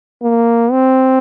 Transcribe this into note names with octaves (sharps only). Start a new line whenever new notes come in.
A#3
C4